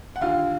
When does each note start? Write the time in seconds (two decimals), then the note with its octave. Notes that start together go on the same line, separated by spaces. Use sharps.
0.16 F#5
0.21 D#2 D3 F4 F5